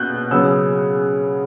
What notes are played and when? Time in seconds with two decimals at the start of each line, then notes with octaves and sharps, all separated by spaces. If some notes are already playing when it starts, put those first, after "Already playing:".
Already playing: B2 F#6 G6
0.31 C#3 F#3 B3 E6